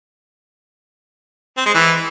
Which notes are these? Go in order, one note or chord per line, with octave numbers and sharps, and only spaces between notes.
C4
G#3
E3